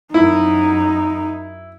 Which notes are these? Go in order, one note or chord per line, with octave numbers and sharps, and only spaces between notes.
F#2 D#4 E4